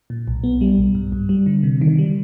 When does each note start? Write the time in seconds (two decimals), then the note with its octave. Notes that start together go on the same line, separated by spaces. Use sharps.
0.10 A#2
0.28 B1
0.44 B3
0.61 G3
0.78 B1
0.95 G2
1.12 G2
1.29 G3
1.46 D3
1.63 C3
1.81 D#3
1.98 G3